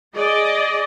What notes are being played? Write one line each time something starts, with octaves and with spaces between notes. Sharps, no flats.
G#4 D5 D#5